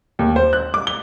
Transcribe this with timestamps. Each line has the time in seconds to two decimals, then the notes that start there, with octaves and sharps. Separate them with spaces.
0.19 D#2
0.36 C5
0.53 F#6
0.74 D6
0.87 G7